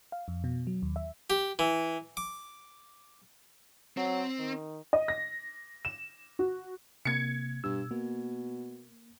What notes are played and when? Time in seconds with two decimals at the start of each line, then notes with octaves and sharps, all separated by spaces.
0.12 F5
0.28 F2
0.44 B2
0.67 F#3
0.82 D#2
0.96 E5
1.30 G4
1.59 E3
2.17 D6
3.97 F#3 C4
4.39 D#3
4.93 D#5
5.08 A#6
5.85 E7
6.39 F#4
7.05 C3 A#3 G#6 C#7
7.64 G2 B2 E6
7.91 B2 A#3